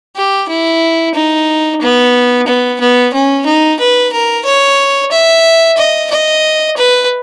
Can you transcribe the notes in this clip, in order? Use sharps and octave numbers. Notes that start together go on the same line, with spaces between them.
G4
E4
D#4
B3
B3
B3
C#4
D#4
B4
A#4
C#5
E5
D#5
D#5
B4